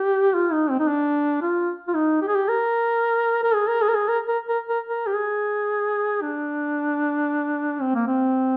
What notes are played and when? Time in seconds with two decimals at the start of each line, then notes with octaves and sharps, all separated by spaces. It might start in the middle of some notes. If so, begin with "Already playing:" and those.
Already playing: G4
0.34 F4
0.52 D#4
0.70 C4
0.79 D#4
0.88 D4
1.42 F4
1.88 F4
1.94 D#4
2.22 G4
2.28 G#4
2.35 G4
2.48 A#4
3.44 A#4
3.54 G#4
3.68 A#4
3.81 G#4
3.88 A#4
3.94 G#4
4.08 A#4
4.28 A#4
4.49 A#4
4.69 A#4
4.89 A#4
5.07 G4
5.15 G#4
6.22 D4
7.81 C4
7.95 A#3
8.07 C4